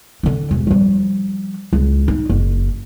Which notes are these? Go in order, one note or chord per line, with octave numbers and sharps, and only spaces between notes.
D3 D4
E1
F3 G3
C#2
D#4
F#1